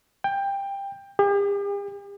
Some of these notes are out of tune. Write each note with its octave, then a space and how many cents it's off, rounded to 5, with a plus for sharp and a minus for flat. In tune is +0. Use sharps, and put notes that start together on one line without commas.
G5 +15
G4 +45